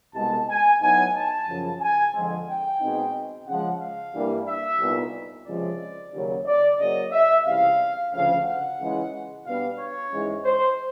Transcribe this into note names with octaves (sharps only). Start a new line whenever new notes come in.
C2 B2 G#3 A5
G#5
A2 F#3 B3 D#4 G#5
A5
F#2 C#3 F3
G#5
F2 D3 F3 G#3 C4
G5
B2 G#3 C4 D#4
C#3 F3 G#3 F#5
F5
G2 E3 G3 A#3 D4
E5
C2 A#2 G3 B3 D#4
C#2 C3 F3 G#3 D5
D#2 C#3 F#3
D5
C#3 F#3 A#3 C#4 D#5
E5
C#2 C3 E3 G3 F5
D2 C#3 F3 F5
F#5
C#2 C#3 E3 G#3
B2 G3 B3 D4 F5
C#5
G#2 E3 G#3 C#4
C5